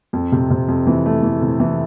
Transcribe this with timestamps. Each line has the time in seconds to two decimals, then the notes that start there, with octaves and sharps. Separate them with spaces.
0.13 F2
0.32 C3
0.50 C3
0.68 F2
0.87 E3
1.06 A3
1.23 E3
1.42 C3
1.60 E3